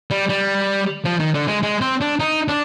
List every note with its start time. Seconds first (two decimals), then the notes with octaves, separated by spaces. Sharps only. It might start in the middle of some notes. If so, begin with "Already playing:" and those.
0.11 G3
0.29 G3
1.05 F3
1.20 D#3
1.34 D3
1.47 G#3
1.63 G#3
1.81 C4
2.01 D4
2.19 D#4
2.48 D4